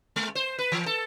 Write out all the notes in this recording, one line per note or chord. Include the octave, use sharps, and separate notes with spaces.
G#3
C5
B4
E3
A4